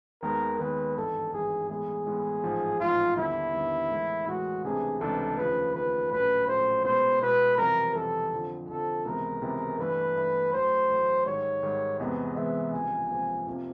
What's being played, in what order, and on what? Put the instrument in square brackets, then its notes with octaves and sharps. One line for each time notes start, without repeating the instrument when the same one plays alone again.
[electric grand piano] D#2 D#3 G#3 B3 [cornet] A#4
[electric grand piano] D#2 D#3 G#3 B3 [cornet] B4
[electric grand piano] G#1 G2 E3 [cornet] A4
[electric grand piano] G#1 G2 E3 [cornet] G#4
[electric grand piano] A2 E3 G#3 B3 [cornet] G#4
[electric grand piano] A2 E3 G#3 B3
A1 G#2 F3
[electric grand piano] A1 G#2 F3 [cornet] F4
[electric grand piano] D#2 D3 G3 B3 D4 [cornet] E4
[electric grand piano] D#2 D3 G3 B3 D4
A2 E3 G#3
[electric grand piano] A2 E3 G#3 [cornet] F#4
[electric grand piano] C#2 C3 E3 A3 D4 [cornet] G#4
[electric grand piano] C#2 C3 E3 A3 D4 [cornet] A4
[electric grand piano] D#2 C#3 F3 A3 [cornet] B4
[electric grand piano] D#2 C#3 F3 A3 [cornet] B4
[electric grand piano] A#1 A2 F#3 A3 C#4 [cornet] B4
[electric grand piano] A#1 A2 F#3 A3 C#4 [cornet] C5
[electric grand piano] B2 G#3 B3 E4 [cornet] C5
[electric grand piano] B2 G#3 B3 E4 [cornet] B4
[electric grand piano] F2 C3 E3 G3 [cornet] A#4
[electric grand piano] F2 C3 E3 G3 [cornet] A4
[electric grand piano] F2 D3 F3
[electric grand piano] F2 D3 F3 [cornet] A4
[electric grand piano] C#2 C3 E3 G#3 B3 [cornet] A#4
[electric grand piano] C#2 C3 E3 G#3 B3
[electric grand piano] G2 E3 A3 [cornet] B4
[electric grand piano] G2 E3 A3
[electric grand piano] A1 A2 F#3 A3 [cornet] C5
[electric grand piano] A1 A2 F#3 A3
[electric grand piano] G#2 D#3 G3 [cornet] C#5
[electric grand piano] G#2 D#3 G3
[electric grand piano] E2 C3 E3 G#3 B3 [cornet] D#5
[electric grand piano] E2 C3 E3 G#3 B3 [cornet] E5
[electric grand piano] C#2 C3 F3 A#3 [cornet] G#5
[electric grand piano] C#2 C3 F3 A#3
F2 C3 F3 A#3